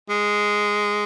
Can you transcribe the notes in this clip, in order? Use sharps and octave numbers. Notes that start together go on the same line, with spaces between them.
G#3